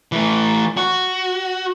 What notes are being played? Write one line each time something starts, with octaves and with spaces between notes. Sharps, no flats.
E3 A3
F#4